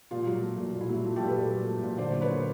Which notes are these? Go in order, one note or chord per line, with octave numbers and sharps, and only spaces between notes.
A#2 F4
F#3
A3
A#2
A#2
E4
F#3
A3 F4
A#2 G4 A4
A4 B4
A#2
F#3
A3
A#2
D3 C5 D5
F#3
B4 C#5
A#3